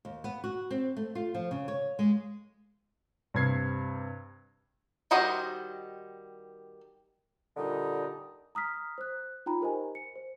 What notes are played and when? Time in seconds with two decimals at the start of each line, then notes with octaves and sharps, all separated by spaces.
0.05 D#2
0.24 B3
0.44 F#4
0.71 C4
0.97 A3
1.15 F4
1.34 F3
1.51 C#3
1.68 C#5
1.99 G#3
3.34 G2 C3 G#6 C7
5.11 D#3 G3 F#4 C5 D#5
7.56 A#2 D3 G3 D#4
8.55 A#5 D#6 F6 B6
8.98 C5 F#6
9.46 D#4 F4 G5 A#5 B5
9.61 G4 A#4 C5 D#5 G#5
9.95 C#7
10.16 C5